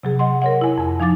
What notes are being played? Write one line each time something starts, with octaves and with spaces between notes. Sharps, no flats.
C3 F#3 G#4
D#5 F#5 C6
A#4 C#5 F#5
E4 G#5
F2 G#5
F3 D#4 F5 D6 A6